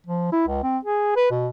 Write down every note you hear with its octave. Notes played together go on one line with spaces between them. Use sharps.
F3
E4
C#2
C4
G#4
B4
B2